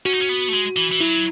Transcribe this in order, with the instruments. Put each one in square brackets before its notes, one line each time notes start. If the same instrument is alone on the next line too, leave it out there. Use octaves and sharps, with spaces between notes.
[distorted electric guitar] C#4 [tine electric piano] F#4
[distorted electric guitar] D#4
C#4
B3
A3
G#3
E3
E3
[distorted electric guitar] F#3 [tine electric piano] E4